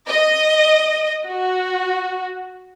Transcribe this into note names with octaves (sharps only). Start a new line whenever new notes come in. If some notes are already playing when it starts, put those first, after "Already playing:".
D#5
F#4